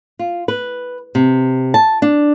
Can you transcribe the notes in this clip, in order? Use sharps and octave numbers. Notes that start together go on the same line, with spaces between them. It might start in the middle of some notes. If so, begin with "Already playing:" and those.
F4
B4
C3
A5
D4